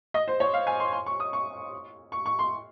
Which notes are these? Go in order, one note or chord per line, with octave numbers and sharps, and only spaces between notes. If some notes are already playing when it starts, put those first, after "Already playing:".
D#5
C5
C#5
F5
G#5
C6
C6
C#6
D#6
C#6
C#6
C#6
C6